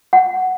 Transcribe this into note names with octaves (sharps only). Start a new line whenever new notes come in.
F#5